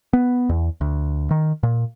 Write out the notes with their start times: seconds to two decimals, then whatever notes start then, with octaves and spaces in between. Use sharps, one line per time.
0.13 B3
0.49 E2
0.81 D2
1.31 D#3
1.63 A#2